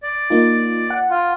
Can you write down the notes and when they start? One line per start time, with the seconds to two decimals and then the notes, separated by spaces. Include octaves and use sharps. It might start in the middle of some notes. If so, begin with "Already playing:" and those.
0.03 D5
0.30 A#3 D#4 F4
0.90 F#5
1.10 F4